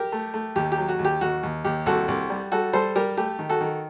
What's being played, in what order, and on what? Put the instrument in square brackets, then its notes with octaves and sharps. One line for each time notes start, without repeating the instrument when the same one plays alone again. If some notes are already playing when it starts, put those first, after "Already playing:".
Already playing: [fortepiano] G4 A#4
A3
A3
D#2 G4
G4
F#3
F#4
D#2
G4
D#2 F#4
D#2
D#2 G4
C2 F#4 A4
C2
G3
G3 F#4 A4
G3 A4 C5
G3 G4 A#4
A3 G4
D#3
F#4 A4
D#3